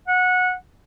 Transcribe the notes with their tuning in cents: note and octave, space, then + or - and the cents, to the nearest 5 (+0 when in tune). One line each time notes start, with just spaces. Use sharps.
F#5 -20